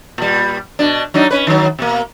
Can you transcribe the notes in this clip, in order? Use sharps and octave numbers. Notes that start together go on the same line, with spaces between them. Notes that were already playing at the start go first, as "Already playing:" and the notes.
A#2 G3
B2 D4
F#3 D4 D#4
C#4 B4
D#3 F#3
B2 A#3